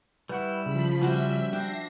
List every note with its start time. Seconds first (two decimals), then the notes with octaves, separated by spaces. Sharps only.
0.29 G3 E4 B4 F#5 C#6
0.66 C#3 F3 B5
1.01 G3 C#4 F#4 C5 E5
1.53 D4 G5 A#6 C7